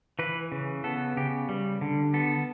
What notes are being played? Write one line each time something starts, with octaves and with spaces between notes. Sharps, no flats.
E3 B4
C#3
B3 A4
C#3 G4
G3
D3
B3 A4